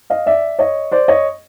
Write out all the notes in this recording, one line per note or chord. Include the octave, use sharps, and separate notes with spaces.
D#5 F5
D5 E5
C#5 D#5
C5 D5
C#5 D#5